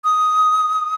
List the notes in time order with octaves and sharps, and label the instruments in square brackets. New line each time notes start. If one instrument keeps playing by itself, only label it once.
[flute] D#6